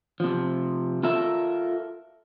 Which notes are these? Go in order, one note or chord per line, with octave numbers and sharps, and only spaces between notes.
C3 F3
F4 A4 A#4 E5